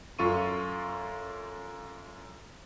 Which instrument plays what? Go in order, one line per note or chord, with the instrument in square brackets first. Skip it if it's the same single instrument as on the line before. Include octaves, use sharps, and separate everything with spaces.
[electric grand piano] F#2 F4 A4 C#6 D#7